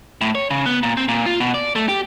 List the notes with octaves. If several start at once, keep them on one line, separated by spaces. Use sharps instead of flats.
A2
C#5
C#3
B3
A#2
C4
A#2
F4
B2
D5
A3
G4